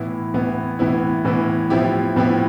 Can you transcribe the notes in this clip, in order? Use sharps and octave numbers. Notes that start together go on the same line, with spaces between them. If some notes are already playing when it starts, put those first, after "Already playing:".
Already playing: A2 E3 B3 E4
A2 E3 B3 E4
A2 E3 B3 E4
A2 E3 B3 E4
A2 F3 B3 E4 G4
A2 F3 B3 E4 G4